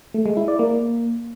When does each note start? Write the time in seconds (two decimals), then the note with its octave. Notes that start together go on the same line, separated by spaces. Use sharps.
0.14 A3
0.26 G#3
0.37 E4
0.48 D5
0.59 A#3